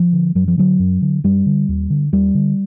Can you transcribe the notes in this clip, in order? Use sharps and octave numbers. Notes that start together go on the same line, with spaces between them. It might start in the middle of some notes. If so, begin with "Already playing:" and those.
Already playing: F3
D3
F#2 F#3
F3
D3 F#3
F#2
D3
F#2 G3
D3
D#2
D3
D#2 G3
D3